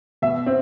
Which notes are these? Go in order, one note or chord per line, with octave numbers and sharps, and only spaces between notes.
B2 E5
C4